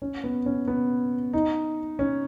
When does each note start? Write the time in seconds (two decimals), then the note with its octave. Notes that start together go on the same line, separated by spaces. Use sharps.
0.02 C#4
0.24 B3
0.46 C#4
0.67 B3
1.33 D#4
1.99 C#4